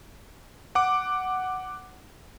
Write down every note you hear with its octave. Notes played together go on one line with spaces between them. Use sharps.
F#5 D6